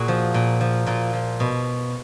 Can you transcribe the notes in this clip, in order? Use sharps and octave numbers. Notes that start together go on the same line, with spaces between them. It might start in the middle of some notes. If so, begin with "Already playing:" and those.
Already playing: A#2 F#4 G#4
F3
A#2
F3
A#2 F4
F3
B2